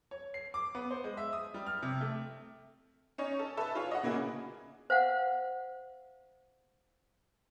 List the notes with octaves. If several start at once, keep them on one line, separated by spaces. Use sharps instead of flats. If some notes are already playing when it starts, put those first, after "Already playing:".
C#5
C7
D6
B3
C5
G#3
E5
D#6
G3
F6
C3
A3
C#4 D#4 C#5
A4
A4 B4 E5 A5
F4 G#4 C#5
D#5 F#5
A#2 C#3 A#3 E4 F#4 G#4
C5 F5 F#5